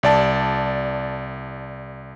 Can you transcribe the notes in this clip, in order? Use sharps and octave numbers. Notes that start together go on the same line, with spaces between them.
C2 D5 A5